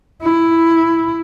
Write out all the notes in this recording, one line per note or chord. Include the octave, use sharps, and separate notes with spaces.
E4